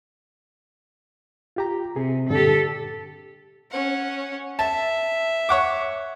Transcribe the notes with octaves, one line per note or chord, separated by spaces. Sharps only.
F4 G4 A#5
C3 G#4
G2 A#2 D3 G4 A4
C#4 F#5
E5 A5
C#5 F#5 D6